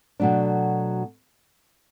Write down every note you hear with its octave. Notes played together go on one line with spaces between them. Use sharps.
B2 F#3 A3 D4